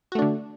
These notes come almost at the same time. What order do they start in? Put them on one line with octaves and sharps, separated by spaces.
F#4 A3 D4 D3